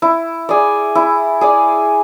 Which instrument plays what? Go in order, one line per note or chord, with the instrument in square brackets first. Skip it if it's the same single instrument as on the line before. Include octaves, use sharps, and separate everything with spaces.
[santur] E4
G#4 D5
E4
G#4 D5